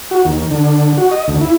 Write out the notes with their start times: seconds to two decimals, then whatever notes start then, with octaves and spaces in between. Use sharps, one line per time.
0.11 F#4
0.25 D#2
0.51 D3
0.98 F#4
1.11 D#5
1.28 D2
1.41 E4